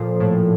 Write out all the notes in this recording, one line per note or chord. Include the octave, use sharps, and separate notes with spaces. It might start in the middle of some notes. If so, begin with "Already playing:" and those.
Already playing: A#2 F3 A4
A2